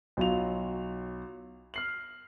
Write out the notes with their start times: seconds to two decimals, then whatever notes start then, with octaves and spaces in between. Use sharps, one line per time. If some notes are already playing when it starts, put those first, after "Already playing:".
0.17 B1 F#3 F4 F7
1.74 F6 C7 F#7